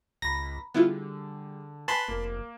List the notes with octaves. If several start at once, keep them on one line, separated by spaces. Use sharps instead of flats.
C#2 A#5 B5 A#6
D3 G3 B3 E4 F4 G#4
B4 G#5 A5 B5 C6
F1 A#3